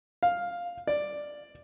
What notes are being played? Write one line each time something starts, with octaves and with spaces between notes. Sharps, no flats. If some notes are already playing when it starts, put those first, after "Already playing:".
F5
D5